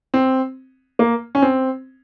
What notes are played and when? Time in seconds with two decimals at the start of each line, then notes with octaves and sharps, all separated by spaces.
0.14 C4
0.99 A#3
1.35 C#4
1.42 C4